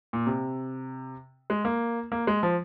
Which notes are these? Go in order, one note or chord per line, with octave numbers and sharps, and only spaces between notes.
A#2
C3
G#3
A#3
A#3
G#3
F3